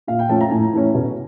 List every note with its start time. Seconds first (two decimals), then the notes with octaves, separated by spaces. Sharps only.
0.07 A#2 F5
0.19 G5
0.29 F3 A3 C#4 A5
0.41 A#5
0.51 A2 G#5
0.73 E3 A3 C#4
0.94 B2